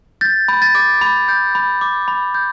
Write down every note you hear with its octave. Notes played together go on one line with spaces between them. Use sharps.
G6 A6
B5
A6
D6
B5
G6
B5
D6
B5
G6